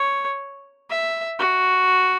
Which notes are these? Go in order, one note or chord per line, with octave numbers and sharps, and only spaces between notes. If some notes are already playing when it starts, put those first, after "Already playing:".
Already playing: C#5
E5
F#4